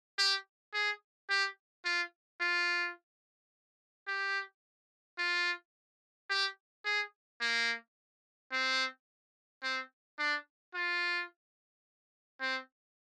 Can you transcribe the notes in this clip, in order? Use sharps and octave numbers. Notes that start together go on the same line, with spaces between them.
G4
G#4
G4
F4
F4
G4
F4
G4
G#4
A#3
C4
C4
D4
F4
C4